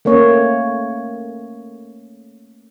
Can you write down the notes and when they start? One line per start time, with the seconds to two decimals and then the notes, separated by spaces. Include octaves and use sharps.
0.05 A3 A#3 C#4 C#5